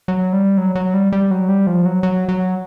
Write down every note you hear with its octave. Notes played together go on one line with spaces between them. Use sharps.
F#3
G3
F#3
F#3
G3
G3
F#3
G3
F3
F#3
F#3
F#3